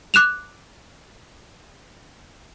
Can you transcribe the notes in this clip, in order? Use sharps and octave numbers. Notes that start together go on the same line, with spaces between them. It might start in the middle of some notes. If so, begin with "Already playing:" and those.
D6 F#6 E7 F7